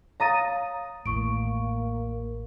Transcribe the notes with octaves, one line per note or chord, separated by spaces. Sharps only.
C#5 F5 A#5 D#6 A6 D#7
A1 D#2 A2 A#3 C#6 D7